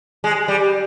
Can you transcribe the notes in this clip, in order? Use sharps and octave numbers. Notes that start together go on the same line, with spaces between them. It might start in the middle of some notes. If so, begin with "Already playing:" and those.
G#3
G3